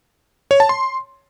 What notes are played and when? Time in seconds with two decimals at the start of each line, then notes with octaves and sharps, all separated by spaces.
0.51 C#5
0.60 A5
0.69 C6